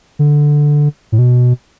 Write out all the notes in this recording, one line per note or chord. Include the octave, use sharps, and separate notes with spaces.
D3
A2
B2